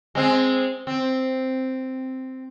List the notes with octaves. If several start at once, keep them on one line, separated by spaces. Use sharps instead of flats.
G#3 C4
C4